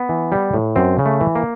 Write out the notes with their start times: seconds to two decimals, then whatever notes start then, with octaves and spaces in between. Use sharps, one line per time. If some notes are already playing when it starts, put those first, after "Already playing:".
Already playing: B3
0.09 E3
0.32 G3
0.54 A2
0.76 F#2 C4
0.99 C#3
1.06 A3
1.21 E3
1.35 A#3